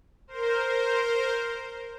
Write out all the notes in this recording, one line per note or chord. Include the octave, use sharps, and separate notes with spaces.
A#4 C5
A#4 C5